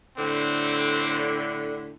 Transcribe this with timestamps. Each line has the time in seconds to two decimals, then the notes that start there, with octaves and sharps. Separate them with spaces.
0.18 A2 D3 C4